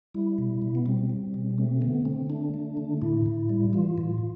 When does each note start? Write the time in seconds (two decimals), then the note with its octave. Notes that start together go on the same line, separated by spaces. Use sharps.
0.14 G3 E4
0.38 B2
0.62 B2
0.75 B3
0.86 G3 C4
1.10 G3
1.34 B2
1.58 A3 C4
1.81 D3 B3
2.05 D3 C4
2.30 A3 D4
2.54 A3
2.77 D3
3.02 A2 E4
3.26 A2
3.49 G3
3.73 E3 F4
3.98 A2